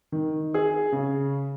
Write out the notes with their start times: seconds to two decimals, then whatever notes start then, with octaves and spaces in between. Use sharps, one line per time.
0.12 D#3
0.54 G#4
0.92 C#3